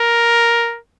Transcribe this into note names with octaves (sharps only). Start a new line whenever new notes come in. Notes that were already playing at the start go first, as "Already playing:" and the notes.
Already playing: A#4